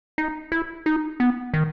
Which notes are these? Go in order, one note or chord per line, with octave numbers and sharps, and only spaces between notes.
D#4
E4
D#4
B3
D#3